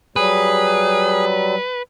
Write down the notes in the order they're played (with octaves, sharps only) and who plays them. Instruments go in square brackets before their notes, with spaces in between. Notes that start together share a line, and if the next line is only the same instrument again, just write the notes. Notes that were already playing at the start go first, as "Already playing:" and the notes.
[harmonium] F#3 G3 [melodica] G#4 [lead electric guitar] B4